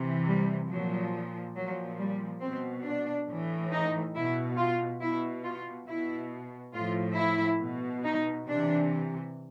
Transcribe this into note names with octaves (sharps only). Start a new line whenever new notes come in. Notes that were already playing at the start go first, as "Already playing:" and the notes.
Already playing: C3 E3
G3
A#2 F3 F#3
A#2 F3 F#3
G3
B2 C4
D4
A2 E3
D#4
B2 E4
F4
B2 E4
F4
B2 E4
A2 F4
F3
E4
B2
D#4
C3 E3 D4